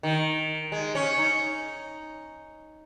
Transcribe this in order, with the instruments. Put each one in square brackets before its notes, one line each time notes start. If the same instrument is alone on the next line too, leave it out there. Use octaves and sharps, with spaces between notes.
[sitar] D#3
G#3
C#4
D#4